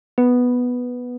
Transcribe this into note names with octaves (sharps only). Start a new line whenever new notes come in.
B3